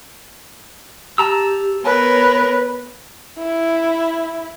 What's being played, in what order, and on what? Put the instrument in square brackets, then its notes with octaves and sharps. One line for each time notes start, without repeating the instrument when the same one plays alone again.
[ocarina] G4 [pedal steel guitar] A5 A#5 E6
[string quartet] B3 A#4 [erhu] B4 [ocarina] C#5
[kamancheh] E4